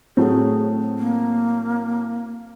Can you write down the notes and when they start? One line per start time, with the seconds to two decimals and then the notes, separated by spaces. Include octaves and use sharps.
0.17 A2 F#3 A3 C4 G#4
0.98 A#3